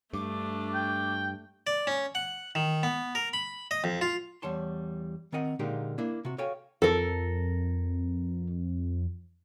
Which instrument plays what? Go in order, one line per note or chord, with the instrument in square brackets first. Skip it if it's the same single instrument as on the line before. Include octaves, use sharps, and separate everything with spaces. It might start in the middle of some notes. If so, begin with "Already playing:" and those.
[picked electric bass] G2 [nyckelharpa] A3 D4 [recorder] D6
[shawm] G5
[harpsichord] D5
C#4
F#5
D#3
B3
A#4
B5
D#5
F2
F4
[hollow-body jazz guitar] E2 G3 C#5 A5 C6
D#3 C4 A#4 D#5 F#5
A#2 D3 G#3 A#3 D#4 G4
A#3 D4 E4
C3 F#4
F#4 A4 C#5 F5 G5 G#5
[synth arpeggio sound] F2 [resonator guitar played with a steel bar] A4 A#4